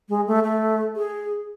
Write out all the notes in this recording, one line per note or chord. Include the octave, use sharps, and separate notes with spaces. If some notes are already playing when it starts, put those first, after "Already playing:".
G#3
A3
A3
G#4